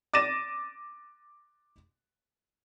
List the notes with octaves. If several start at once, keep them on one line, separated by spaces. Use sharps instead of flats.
D6 A6 A#6 D#7 E7